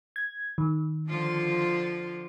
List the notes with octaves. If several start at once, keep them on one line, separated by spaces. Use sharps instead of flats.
G#6
D#3
D3 F3 F4